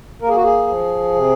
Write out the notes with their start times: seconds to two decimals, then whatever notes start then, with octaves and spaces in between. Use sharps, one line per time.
0.22 A#3 A#4
0.29 G#4
0.36 F#4
0.43 G#4
0.68 F3
1.14 C3